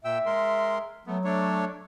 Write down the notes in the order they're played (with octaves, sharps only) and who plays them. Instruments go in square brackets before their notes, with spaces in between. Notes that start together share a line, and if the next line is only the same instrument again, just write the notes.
[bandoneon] A#2 G5 E6 [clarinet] E5
[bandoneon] G#3 A#4 C6
[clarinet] F#3 [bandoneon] A3 B3
[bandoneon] A3 D4 C#5